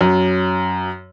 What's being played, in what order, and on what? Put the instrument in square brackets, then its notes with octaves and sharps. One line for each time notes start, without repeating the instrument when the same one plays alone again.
[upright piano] F#2